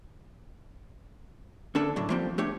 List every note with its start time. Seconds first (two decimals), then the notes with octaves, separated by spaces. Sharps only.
1.75 D2 C#4 D4 A4
1.96 A2 D3 F#3 D4
2.10 F3 G3 A#3 C4
2.38 A3 D4 G4 C#5